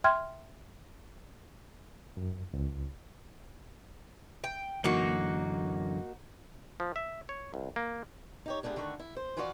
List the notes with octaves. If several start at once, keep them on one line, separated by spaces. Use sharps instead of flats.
E5 G5 C6 F6 G#6
F#2
C#2
G5
F#2 D3 E3 A#3 D#4 F#4
F3
E5
C#5
C2
A#3
D#4 G4 C#5
G#2 G3 A3 D4 G#4
D3 D#3 A3 F#4
E4
C5
E3 F3 F4 F#4 C5 D5